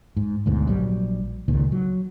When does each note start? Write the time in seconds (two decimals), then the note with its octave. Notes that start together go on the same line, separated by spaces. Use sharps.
0.17 G#2
0.46 D2 G#2 B2
0.67 A#1 F#3 G3
1.48 C#2 A#2 D#3
1.72 F#3